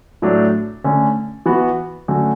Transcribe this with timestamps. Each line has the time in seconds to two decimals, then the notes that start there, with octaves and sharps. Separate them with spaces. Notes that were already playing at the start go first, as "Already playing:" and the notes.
0.22 A2 F#3 A3 D4
0.84 D3 A3 C#4
1.46 E3 B3 F#4
2.08 D3 F#3 A3 C#4 F#4